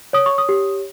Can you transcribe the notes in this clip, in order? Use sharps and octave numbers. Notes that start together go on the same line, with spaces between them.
C#5 D#6
C#6
D#6
G4